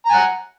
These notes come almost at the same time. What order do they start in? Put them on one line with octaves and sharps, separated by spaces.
A#5 G#5 F#5